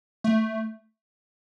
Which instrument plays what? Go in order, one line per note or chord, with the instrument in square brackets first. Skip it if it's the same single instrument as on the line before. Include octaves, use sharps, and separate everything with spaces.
[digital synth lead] A3